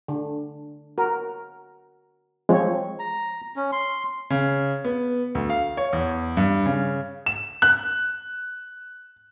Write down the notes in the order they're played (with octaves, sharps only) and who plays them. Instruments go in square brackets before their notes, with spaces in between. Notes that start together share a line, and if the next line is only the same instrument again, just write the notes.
[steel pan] D3
F#4 A#4
[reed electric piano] F3 G#3 [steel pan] C4 C#5
[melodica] A#5
C#4
C6
[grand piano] C#3
B3
D2
F5
C#5
E2
G2
C#3
E7
F#6